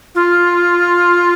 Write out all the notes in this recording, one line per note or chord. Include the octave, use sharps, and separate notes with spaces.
F4